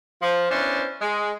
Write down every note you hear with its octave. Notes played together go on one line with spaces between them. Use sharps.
F3
B3 C#4 D4 E4 C5
G#3